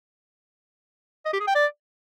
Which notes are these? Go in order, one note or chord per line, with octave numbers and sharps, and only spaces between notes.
D#5
G4
G#4
G5
D5